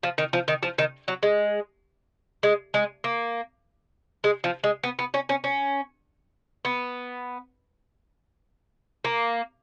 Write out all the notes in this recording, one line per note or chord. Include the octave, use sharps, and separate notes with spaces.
F3
D#3
F3
D#3
F3
D#3
F#3
G#3
G#3
G#3
A#3
G#3
F3
G#3
B3
B3
C#4
C#4
C#4
B3
A#3